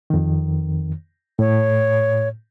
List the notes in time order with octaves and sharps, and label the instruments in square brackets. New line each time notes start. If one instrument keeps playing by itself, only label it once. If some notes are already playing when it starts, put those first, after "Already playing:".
[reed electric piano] F2 D#3
[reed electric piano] A2 [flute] C#5